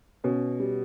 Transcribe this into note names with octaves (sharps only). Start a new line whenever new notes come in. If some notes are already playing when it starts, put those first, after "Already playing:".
B2 C#4
G3